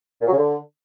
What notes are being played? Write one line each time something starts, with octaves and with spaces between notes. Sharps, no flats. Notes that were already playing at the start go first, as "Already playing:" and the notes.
A#2
F#3
C#3
D3